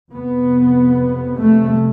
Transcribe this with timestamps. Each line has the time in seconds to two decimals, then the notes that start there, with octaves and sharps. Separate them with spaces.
0.13 F2 C3 B3
1.43 A3